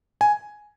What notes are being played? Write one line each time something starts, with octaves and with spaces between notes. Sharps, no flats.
G#5